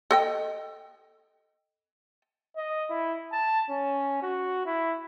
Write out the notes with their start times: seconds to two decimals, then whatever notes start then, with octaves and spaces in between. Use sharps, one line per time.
0.11 A4 D#5 G5
2.57 D#5
2.90 E4
3.33 A5
3.70 C#4
4.22 F#4
4.66 E4